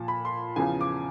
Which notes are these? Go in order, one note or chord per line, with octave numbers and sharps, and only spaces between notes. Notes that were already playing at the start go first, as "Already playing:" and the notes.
Already playing: A#2 F3 A5
B5
C6
E2 C#3 F3 G#5
D6